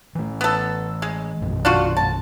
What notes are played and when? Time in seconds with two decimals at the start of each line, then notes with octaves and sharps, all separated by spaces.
0.15 E3 A3
0.41 B3 A4
1.02 G#3
1.41 A#1 F#2 B2
1.65 D4 F4 F#4
1.97 A5